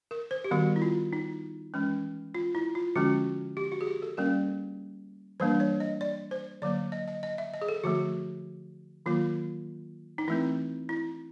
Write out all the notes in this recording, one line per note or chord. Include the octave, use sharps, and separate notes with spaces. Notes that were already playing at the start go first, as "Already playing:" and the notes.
A#4
C5
G4
D#3 G3 B3 F#4
E4
F4
D#4
E3 G#3 C#4
F4
E4
F4
D3 F3 G#3 C#4 F#4
G4
F#4
G#4
G4
A4
G3 A#3 C#4 A#4
E3 G3 A#3 D4 C5
C#5
D#5
D5
C5
D3 F#3 A#3 D5
D#5
D#5
D#5
E5
D#5
G#4
A4
D3 F3 A3 F#4
D#3 F#3 A#3 F4
D#4
E3 A3 C4 E4
E4